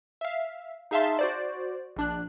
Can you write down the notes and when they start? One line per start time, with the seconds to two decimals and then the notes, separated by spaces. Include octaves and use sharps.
0.21 E5 F5
0.91 D#4 G#4 E5 F5 A5 C6
1.19 F#4 C5 D5
1.96 A#1 D4 F#6